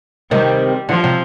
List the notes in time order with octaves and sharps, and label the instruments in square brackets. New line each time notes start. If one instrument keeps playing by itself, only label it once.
[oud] C3 D#3 [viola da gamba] G3
[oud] D3 [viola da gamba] F3
[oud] C3